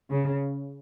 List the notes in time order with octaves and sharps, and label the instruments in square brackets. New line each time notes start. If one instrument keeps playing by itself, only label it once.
[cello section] C#3